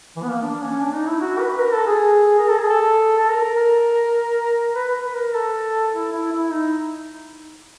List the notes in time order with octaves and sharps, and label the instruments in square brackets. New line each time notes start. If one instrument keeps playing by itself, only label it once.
[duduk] E3
B3
A#3
D4
C#4
D4
D#4
E4
F#4
B4
A#4
A4
G#4
A#4
A4
G#4
A4
A4
A#4
A#4
A#4
B4
B4
B4
A#4
A4
E4
E4
E4
D#4